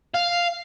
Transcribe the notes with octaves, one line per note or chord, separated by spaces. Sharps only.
F5